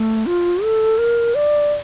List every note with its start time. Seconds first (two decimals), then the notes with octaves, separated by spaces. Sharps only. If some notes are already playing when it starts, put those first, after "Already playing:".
Already playing: A3
0.26 F4
0.63 A4
0.98 A#4
1.35 D5